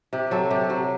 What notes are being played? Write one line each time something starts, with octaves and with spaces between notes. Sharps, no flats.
C3 G4
F#3 A4
C3 G4
F#3